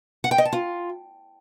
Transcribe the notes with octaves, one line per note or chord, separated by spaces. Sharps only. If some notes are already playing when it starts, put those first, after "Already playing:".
F#5
G5
D#5
A5
F4